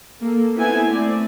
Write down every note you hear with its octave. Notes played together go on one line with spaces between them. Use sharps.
A#3 A4
B3 C4 E4 A4 G#5
A3 C4 D5